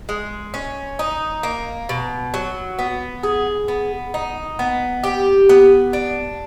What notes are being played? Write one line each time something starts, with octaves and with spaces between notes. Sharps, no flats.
G#3
C#4
D#4
A#3
B2
F#3
B3
G#4
B3
D#4
B3
G4
B3
D4